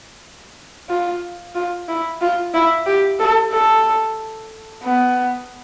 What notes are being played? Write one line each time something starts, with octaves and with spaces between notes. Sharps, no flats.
F4
F4
E4
F4
E4
G4
A4
A4
B3